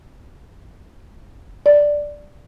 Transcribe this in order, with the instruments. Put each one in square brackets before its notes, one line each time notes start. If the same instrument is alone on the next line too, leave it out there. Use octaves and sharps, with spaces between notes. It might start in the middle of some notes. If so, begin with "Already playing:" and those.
[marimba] D5